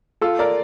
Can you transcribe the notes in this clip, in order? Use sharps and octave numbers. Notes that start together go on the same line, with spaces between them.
F4 A4
A#4 D5